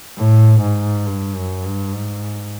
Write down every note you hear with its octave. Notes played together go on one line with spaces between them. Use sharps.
A2
G#2
G2
F#2
G2
G#2